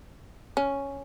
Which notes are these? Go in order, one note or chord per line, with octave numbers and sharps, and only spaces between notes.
C#4